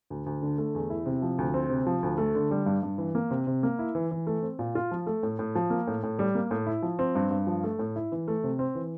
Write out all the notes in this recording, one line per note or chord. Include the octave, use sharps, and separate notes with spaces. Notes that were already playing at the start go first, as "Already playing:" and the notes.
D2
D2
D3
A3
E2
E4
C3
F3
D2
C4
C3
F3
D2
A3
D3
G3
G2
G2
E3
A#3
C3
C3
A#3
E4
E3
E3
A3
C4
A#2
F4
F3
A3
A2
A2
F3
A#3
A2
A2
G3
A#3
A2
E4
F3
C4
G2
G2
F3
A3
A2
E4
E3
A3
C3
C4
E3